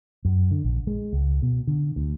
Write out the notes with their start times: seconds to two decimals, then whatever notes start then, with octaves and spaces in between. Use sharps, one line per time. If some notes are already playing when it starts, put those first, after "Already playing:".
0.25 F#2
0.51 D3
0.64 A#1
0.87 G#3
1.13 C#2
1.42 B2
1.67 D3
1.96 D2